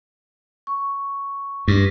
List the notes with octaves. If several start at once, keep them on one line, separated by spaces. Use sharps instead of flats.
C#6
G2